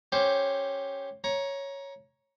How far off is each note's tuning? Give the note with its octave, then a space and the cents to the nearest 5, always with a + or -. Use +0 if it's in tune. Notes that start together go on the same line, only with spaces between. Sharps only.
C#4 -5 G4 +0 C5 +10
C#5 +0 A#5 +20